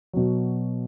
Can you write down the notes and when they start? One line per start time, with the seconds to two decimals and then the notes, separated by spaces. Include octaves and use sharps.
0.13 B2 F#3